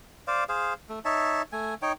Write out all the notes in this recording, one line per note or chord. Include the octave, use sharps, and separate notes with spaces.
C5 D5 F5
G#4 C5 F5
A3
D#4 C#5 E5 A5
A3 G#5
D#4 C#5 G5